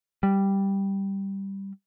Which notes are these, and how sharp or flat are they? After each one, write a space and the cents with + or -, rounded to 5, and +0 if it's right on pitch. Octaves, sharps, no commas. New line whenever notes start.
G3 +0